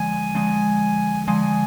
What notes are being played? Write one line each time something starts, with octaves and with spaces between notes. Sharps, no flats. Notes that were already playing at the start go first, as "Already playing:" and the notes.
Already playing: D3 F3 G#3 G#5
D3 F3 G#3
D3 F3 G#3 G#5